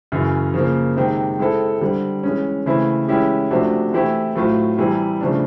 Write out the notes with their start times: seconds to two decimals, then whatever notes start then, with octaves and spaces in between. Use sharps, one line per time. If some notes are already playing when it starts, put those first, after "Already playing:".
0.12 F#2 C#3 E3
0.54 C#3 F3 A#3
0.96 C3 D#3 G#3 C4
1.39 G#3 C4 E4 A4
1.81 D3 G3 C4
2.23 E3 G#3 C#4
2.66 C#3 E3 A3 C4 E4
3.08 E3 G#3 C#4 E4 G4
3.51 C3 F3 A3 D4 F#4
3.93 E3 A3 C4 E4 G4
4.36 A2 F#3 A3 C4 F4
4.78 C3 E3 G3
5.21 C#3 F3 A3 D4